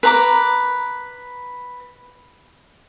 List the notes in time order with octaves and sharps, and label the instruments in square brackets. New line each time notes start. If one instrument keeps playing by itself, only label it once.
[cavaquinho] B4 A#5 D6